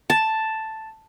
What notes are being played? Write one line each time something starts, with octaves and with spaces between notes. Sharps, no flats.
A5